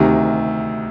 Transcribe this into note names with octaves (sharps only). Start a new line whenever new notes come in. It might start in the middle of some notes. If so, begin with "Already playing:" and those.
Already playing: D2 C3 D#3